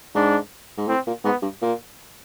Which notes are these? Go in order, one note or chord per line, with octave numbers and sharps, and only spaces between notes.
G#2 D4
G#2
A2 C4
A#2
G#2 B3
G2
A#2